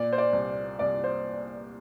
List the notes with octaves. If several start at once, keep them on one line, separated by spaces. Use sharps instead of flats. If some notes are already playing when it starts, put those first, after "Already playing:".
Already playing: A#2 D5
C5
D5
C2
C2 D5
C5